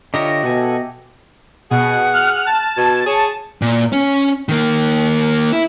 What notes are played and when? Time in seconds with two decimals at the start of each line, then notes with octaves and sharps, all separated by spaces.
0.14 D3 F4 G4 C#5 D#5 E5 A#5 A#6
0.44 B2 F#4 A4 G#5
1.71 B2 G#4 F#5
2.13 F6 F#6
2.46 A5
2.77 B2 G#6
3.06 G#4 C#5
3.62 A#2
3.93 C#4
4.49 D#3 A#3
5.52 E4